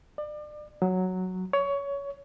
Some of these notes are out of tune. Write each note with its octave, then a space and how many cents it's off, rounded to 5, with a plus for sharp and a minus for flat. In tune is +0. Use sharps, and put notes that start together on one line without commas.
D5 +35
F#3 +0
C#5 +20